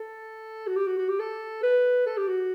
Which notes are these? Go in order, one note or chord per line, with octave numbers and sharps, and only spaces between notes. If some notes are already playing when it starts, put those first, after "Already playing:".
Already playing: A4
F#4
G4
F#4
F#4
G4
A4
B4
A4
G4
F#4